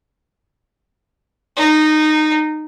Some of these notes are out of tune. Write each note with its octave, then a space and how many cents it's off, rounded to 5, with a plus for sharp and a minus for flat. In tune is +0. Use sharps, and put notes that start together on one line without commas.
D#4 -15